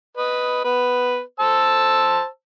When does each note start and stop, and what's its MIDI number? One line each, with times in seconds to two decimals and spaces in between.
0.17 0.60 71
0.17 0.60 75
0.64 1.21 59
0.64 1.21 71
1.40 2.26 72
1.40 2.26 81
1.40 2.26 88